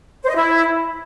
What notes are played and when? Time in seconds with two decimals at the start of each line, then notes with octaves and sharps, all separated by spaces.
0.23 C5
0.29 D#5
0.35 E4